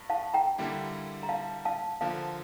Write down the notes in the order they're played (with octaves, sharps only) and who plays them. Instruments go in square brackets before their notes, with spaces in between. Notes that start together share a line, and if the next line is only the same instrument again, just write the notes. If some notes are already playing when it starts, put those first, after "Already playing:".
Already playing: [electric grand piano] G2
[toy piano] F5 A5
G5 A#5
[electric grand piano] D3 G3 A#3 E4
[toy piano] A#5
F5 A5
F5 A5
[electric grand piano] D3 F3 A#3 [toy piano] F5 A5